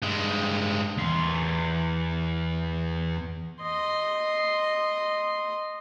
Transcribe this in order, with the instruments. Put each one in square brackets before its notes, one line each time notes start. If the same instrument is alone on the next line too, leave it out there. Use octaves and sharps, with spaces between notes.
[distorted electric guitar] G2 G#3
E2 C6
[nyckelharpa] D#5 C6